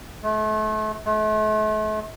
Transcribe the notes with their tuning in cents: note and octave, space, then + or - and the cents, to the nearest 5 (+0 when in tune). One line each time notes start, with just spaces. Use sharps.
A3 -35
A3 -40